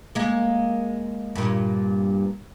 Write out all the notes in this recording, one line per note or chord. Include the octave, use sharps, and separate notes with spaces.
G#3 A#3
G2 A#2